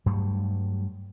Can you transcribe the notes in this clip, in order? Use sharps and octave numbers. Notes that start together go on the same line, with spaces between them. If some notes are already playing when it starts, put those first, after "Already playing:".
G2 F#3 G3 A3